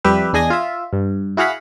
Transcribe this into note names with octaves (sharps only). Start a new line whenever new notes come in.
F2 G3 G4 B4 E5
E2 D4 G#4 D#5 G#5 A#6
F4 E5
G2
E4 F#4 G#4 F5 F#5 B5